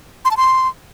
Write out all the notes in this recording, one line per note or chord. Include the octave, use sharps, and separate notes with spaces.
C6
A5
C6